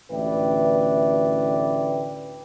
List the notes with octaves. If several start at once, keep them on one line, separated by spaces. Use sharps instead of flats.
A1 D2 B4 D5 E5 G5